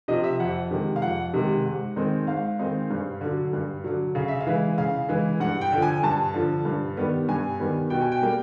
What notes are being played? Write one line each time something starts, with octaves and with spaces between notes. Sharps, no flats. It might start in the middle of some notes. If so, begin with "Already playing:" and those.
C3 F3 D#5
E5
F2 F#5
C3 D#3 G#3
F5
F2 F#5
C3 D#3 G#3
G#2
D#3 G#3 C4 D#4
G#2 F5
D#3 G#3 C4 D#4
G2
D3 F#3
G2
D3 F#3
C#3 F5
E5
F5
E3 G#3
C#3 F5
E3 G#3
G2 F#5
G5
D3 F3
G#5
G2 A5
D3 F3
G2
D#3 G3 B3
G2 G#5
D#3 G3 B3
B2 G5
G#5
G5
G3 A#3